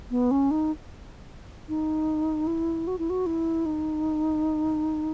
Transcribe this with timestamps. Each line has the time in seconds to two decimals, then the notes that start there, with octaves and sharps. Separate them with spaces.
0.11 B3
0.31 C#4
0.51 D#4
1.69 D#4
2.47 E4
2.87 F#4
2.99 E4
3.10 F#4
3.26 E4
3.66 D#4